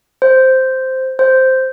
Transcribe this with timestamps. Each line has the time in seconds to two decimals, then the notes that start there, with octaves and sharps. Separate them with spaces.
0.22 C5
1.19 C5